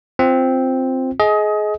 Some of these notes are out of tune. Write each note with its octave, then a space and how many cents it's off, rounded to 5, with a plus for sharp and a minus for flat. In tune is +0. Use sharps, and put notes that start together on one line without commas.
C4 +0 F4 +0
G#4 +25 D#5 +20